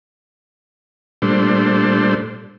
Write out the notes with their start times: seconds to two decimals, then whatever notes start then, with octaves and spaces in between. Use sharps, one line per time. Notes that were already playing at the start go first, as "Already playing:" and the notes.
1.22 A#2 G3 A3 D4 C5